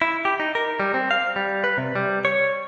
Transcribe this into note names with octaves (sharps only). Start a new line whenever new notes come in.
E4
G4
D#4
A#4
G3
C4
F5
G3
B4
C3
G3
C#5